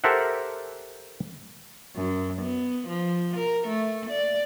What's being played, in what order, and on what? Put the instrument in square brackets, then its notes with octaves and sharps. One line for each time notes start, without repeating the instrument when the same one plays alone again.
[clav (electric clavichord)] G4 A4 A#4 C5 E5 F#5
[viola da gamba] F#2
B3
F3
A#4
A3
D5